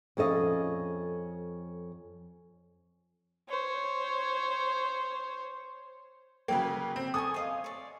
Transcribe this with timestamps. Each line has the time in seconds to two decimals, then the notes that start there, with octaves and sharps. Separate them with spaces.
0.17 F2 C#4 A4 D#5 F5
3.49 C5 C#5
6.48 C#3 F#3 A#3 B4 G5
6.96 C4
7.14 A4 G#5 C#6 D#6
7.34 C5 D#5 F5
7.64 C#5 D5